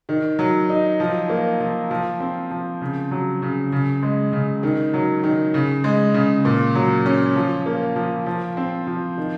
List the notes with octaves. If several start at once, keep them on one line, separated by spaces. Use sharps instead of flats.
D#3
F#3
D#4
F3
A#3
F3
F3
C4
F3
C#3
F#3
C#3
C#3
G#3
C#3
D#3
F#3
D#3
C#3
G#3
C#3
A#2
F#3
C#4
F3
A#3
F3
F3
C4
F3
D#3